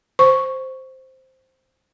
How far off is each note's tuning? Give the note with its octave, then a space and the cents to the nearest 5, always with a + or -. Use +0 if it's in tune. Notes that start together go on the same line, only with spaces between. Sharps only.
C5 +0 C#6 +0